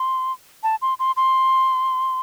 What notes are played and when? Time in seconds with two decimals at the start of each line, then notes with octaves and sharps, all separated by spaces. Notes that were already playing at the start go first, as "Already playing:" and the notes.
Already playing: C6
0.63 A5
0.82 C6
0.99 C6
1.17 C6